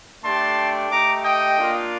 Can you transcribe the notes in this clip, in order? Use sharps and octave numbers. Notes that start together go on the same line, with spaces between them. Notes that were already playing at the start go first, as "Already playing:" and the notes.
A3 D4 G4 A5 C6
A3 D#4 G4 A#5 D6
D#5 G5
A#3 D4 F4